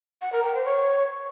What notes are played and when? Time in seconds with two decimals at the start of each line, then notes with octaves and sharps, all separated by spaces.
0.22 F#5
0.32 A#4
0.43 G5
0.54 C5
0.65 C#5